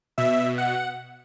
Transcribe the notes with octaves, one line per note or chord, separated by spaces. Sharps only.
B2 E5
F#5